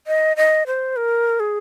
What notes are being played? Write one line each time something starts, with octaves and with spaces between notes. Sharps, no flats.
D#5
D#5
C5
A#4
G#4